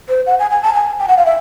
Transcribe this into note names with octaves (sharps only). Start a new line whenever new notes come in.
C5
F#5
G#5
G#5
A5
G#5
G5
F#5
F5
E5